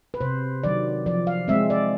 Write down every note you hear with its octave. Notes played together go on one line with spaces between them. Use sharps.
B4
C3 C5
D#3 F#3 D5
F3 D5
F5
G#3 C4 E5
D5